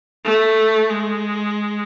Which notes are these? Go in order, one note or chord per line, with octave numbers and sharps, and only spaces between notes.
A3
G#3